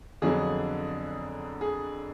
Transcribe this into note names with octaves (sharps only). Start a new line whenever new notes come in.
F2 D3 F#3 B3 D4 G#4
G#4